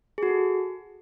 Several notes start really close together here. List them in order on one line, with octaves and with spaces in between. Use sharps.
G#4 F#4 A4